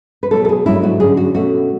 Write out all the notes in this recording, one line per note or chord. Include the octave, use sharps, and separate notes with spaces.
B4
B2 F#3 A3 A4
A4
G#4
G#2 F#3 A3 D4 E4
F#4
D3 F#3 C#4 G#4
F#4
B2 A3 C#4 F#4